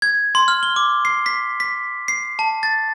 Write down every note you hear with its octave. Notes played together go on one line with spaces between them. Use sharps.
G#6
C6
F6
G7
D6
C7
B6
B6
C7
A5
A6